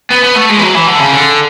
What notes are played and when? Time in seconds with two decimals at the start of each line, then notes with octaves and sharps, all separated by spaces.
0.11 B3
0.24 B3
0.36 A3
0.50 G#3
0.58 E3
0.62 F#3
0.74 E3
0.87 D3
1.00 C#3
1.13 D3